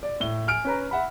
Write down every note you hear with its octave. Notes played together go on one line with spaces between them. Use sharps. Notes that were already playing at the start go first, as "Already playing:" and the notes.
D5
A2 G7
G#5 F6 D7
C#4 B4 A#5
E5 F#5 B5